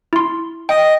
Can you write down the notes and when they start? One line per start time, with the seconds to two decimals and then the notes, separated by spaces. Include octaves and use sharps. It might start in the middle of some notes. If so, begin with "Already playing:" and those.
0.13 E4 C6
0.69 D#5 G5